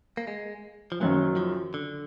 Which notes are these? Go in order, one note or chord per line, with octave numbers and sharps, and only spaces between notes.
A#3
G#3
F3
F#1 F#2 D#3 F#3
F3
D3